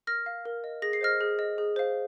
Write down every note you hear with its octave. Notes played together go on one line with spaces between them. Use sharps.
A#4 F6 A#6
F5
A#4
D#5
G#4 A#6
C7
C5 D#5 F6 A#6
G#4
D#5
G#4
C5 F5